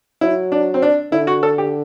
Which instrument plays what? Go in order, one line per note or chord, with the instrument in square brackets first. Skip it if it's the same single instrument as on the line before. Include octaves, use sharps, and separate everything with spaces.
[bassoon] F#3 [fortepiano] E4
[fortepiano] D4
C4
D4
[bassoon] D3 [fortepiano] E4
[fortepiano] F#4
A4
G4